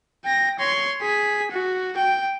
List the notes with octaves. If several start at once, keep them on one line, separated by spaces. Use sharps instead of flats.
G5 A#6
C#5 C6
G#4 B6
F#4
G5